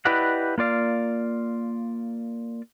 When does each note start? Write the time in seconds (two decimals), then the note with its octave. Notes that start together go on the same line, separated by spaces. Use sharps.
0.05 E4 G4 B4 D5 D#5 F#5
0.58 A#3 F4 D5 F5